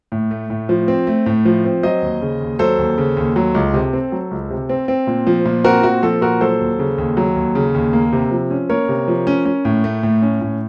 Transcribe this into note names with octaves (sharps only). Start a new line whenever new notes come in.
A2
A3
A2
F3
C4
A3
A2
F3
C4
F#3 C5 D#5
D#2
C#3
D#2
F#3 A4 C5
D#2
C#3
D#2
F#3
C#2
C3
C4
F#3
C#2
C3
C4
C4
A#2
F3
A#2
C4 F#4 A#4
A#2 F#4
F3 A4
A#2 F#4 A#4
F#3 A4 C5
D#2
C#3
D#2
F#3
D#2
C#3
D#2
A#3
C3
F3
C#4
A#3 A#4 C#5
C3
F3
C#4
C#4
A2
A3
A2
C#4
A2